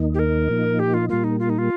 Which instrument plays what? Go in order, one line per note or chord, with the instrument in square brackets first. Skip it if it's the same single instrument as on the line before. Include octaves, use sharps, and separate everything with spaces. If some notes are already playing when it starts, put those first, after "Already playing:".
Already playing: [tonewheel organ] D#2 D#3 A#3 D#4
[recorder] G4
A#4
[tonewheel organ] A#2 F3 A#3 D#4
[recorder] G4
F4
[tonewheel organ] A#2 G3 A#3 [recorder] F4
[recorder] D#4
F4
D#4
F4